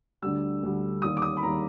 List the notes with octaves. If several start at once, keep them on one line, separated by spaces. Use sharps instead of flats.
D2 D3 G3 E6
D2 D3 G3
D#2 D#3 G3 D#6
D6
D#6
B5
D#2 D#3 G3 A#5